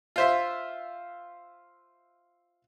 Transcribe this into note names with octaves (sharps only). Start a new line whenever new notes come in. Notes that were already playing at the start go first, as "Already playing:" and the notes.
F4 C5 E5